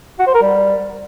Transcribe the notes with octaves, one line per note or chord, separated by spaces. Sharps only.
F#4
C5
A#4
G3